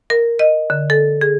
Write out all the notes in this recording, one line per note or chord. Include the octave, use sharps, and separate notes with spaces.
A#4
D#5
D3
A4
G#4